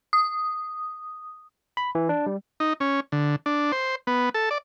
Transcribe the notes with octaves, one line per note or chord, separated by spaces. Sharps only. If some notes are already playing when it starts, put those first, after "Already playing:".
D#6
B5
E3
D4
G3
D#4
C#4
D3
D4
C5
B3
A4
D5